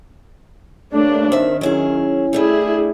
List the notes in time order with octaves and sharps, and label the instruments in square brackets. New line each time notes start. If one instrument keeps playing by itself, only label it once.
[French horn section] G2 A#3 C#5 [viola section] A3 D4
[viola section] D#3 [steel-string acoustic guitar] C4 E5
[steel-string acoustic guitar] F#3 E4 G#4 [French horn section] C#4
[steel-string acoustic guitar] G3 A3 D4 [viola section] E4 G#4